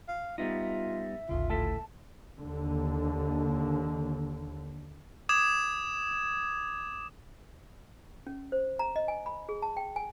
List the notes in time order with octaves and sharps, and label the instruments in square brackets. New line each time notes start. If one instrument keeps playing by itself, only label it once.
[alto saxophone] F5
[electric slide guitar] G3 B3 D#4 [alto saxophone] F4 [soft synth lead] E5
[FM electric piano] G#1 D2 C#3 [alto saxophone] F4
[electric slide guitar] A2 A4 E5 [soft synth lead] A5
[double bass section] D#2 D3
[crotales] D6 D#6 G#6 E7
[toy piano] C#4
C5
A#5
D#5
G#5
B5
G#4
A5
G5
G#5